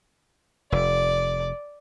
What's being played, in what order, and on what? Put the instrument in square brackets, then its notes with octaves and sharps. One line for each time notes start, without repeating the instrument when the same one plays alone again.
[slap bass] F1 [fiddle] D5